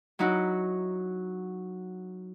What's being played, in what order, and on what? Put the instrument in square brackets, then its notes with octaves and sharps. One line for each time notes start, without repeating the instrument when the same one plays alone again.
[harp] F#3 D#4 E4 F#4